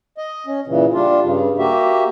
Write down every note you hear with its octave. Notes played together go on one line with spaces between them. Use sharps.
D#5
C#4
A#2 C#3 E3
G3 D4 F4
G2 C#3
A#3 F#4 G4 E5